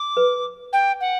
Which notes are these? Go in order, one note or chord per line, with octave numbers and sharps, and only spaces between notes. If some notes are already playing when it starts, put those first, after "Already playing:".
Already playing: D6
B4
G5
F#5